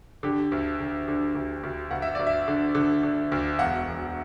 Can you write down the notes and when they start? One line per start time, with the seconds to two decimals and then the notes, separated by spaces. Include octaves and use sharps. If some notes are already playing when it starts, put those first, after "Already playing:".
0.23 D3 G4
0.52 D2
0.80 D3
1.08 D3
1.35 D2
1.63 D2
1.91 D2 F#5
2.02 E5
2.15 D2 D5
2.27 E5
2.48 D3
2.75 D3
3.03 D3
3.32 D2
3.59 E1 F#5
3.86 E1